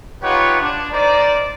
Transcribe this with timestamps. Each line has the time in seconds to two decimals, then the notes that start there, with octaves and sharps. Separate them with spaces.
0.22 D#4 F4 G4 B4 C#5 F#5
0.61 D4
0.91 D#4 A#4 C5 D5